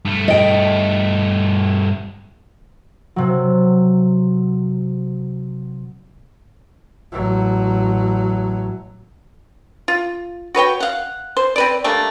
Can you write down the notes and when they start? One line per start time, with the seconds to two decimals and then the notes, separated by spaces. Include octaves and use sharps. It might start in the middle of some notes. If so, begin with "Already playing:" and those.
0.05 G2 A3
0.28 D#5 G5
3.16 C3 F#3
7.12 A1 F#3
9.88 F4
10.55 F#4 B4 C#5 G5
10.80 F5 F#5
11.37 C5
11.56 C4 B4 D5
11.84 G3 A3 A#3 D4